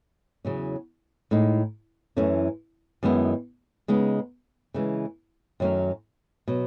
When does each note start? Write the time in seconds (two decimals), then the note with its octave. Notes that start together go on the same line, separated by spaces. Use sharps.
0.45 E2 C#3 F#3 C#4
1.31 A2 G#3 D#4
2.16 F#2 E3 A3 C#4
3.03 F#2 D#3 G#3 B3 E4
3.88 C#3 G#3 B3 D#4
4.74 C#3 E3 G#3
5.60 F#2 D#3 F#3 A3 C#4
6.48 B2 F#3